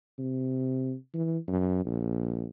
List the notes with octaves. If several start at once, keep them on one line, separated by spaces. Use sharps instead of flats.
C3
E3
F#2
A#1